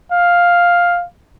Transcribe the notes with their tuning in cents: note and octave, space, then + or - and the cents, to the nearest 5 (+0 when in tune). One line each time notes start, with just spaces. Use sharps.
F5 +5